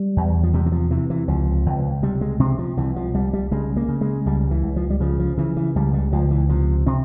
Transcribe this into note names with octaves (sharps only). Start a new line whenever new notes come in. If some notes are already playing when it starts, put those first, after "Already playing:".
Already playing: G3
E2
F3
C3 G3
E3
F3
C3 E3
E3
C#2 F3
C#2
C3 G3
G#3
C3 C4
F3
C2 E3
F3
C2 G3
G3
C#3 G#3
A#3
C#3
G#3
C#2 G3
E3
C#2
F3
G3
C#3 F3
F3
C#3 E3
E3
C#2 G3
G3
C#2 F3
E3
C3 F3
C3 C4